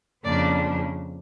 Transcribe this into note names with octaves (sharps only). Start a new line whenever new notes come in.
F2 C#3 F3 A#3 D4 D5